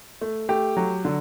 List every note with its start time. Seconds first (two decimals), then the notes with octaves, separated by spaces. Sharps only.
0.21 A3
0.49 A3 G4
0.77 F#3
1.05 D3